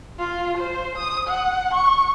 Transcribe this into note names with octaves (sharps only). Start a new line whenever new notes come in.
F4
C5
D#6
F#5
C#6